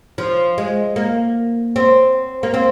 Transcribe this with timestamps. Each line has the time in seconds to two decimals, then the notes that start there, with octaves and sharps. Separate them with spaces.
0.18 F3
0.58 G#3
0.96 A#3
1.76 C4
2.43 A#3
2.54 C4